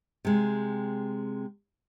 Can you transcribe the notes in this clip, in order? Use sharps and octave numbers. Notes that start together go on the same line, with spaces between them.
C3 G#3